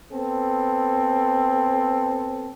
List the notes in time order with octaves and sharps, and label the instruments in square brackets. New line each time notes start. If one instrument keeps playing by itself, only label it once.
[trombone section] B3 C4 A4